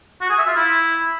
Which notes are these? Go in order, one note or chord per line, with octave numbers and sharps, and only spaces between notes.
F#4
G#4
E5
F4
E4